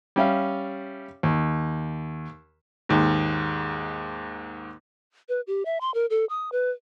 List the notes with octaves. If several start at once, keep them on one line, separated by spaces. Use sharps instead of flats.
G3 C#4 E5 F5
D#2
D#2 G#2
B4
G4
E5
C6
A#4
A4
D#6
B4